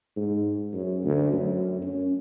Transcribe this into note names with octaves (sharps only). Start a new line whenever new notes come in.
G#2
F#2
D2
F#2
C#4